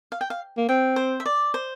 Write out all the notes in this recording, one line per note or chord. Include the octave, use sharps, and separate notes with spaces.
F5
G5
F5
A#3
C4 G5
C5
E5
D5
C5